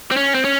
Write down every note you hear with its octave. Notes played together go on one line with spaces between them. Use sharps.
C4
C#4
C4
C#4